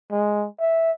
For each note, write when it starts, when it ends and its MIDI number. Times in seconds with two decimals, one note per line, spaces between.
0.11 0.46 56
0.60 0.92 76